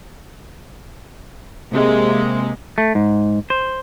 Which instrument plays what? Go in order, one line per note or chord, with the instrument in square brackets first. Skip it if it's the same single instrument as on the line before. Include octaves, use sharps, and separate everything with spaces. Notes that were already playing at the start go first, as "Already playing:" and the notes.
[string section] C3 G#3 A#3
[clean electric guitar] A3
G#2
C5